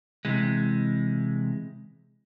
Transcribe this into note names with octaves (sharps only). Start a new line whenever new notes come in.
C3 E3 G#3